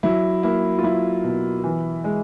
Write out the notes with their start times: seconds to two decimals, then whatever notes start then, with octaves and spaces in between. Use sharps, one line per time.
0.03 F#3 E4
0.43 A#3 E4
0.79 F4
0.83 F#3 E4
1.24 B2
1.64 E3
2.04 G#3